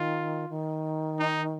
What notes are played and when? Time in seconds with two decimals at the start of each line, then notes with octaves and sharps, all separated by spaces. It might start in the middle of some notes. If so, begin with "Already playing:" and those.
Already playing: D#3 F4
0.49 D#3
1.19 D#4